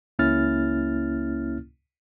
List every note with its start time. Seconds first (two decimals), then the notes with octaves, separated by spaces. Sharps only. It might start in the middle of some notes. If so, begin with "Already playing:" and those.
0.19 C#2 A#3 C#4 E4 F6 A6